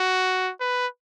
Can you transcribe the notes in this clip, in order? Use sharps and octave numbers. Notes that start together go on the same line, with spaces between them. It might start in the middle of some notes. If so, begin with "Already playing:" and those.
Already playing: F#4
B4